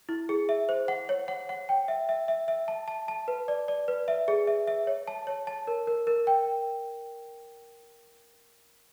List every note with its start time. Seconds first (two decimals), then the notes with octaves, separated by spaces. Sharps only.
0.09 E4
0.29 G#4
0.49 E5
0.69 C5
0.88 F#5
1.09 C#5
1.28 F#5
1.49 F#5
1.69 G5
1.88 E5
2.09 E5
2.28 E5
2.48 E5
2.68 A5
2.88 A5
3.08 A5
3.28 B4
3.48 D5
3.68 D5
3.88 B4
4.08 E5
4.28 G#4
4.47 E5
4.67 E5
4.87 C#5
5.08 A5
5.27 C#5
5.47 A5
5.67 A#4
5.87 A#4
6.07 A#4
6.27 G5